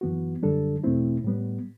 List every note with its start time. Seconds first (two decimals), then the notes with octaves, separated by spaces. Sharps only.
0.01 F#2 E3 B3 F#4
0.43 F#2 D3 G3 D4 A4
0.83 E2 B2 A3 C4 E4
1.24 A2 G3 B3